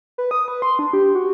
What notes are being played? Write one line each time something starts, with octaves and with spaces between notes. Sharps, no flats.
B4
D#6
B4
C6
D4
G4
F#4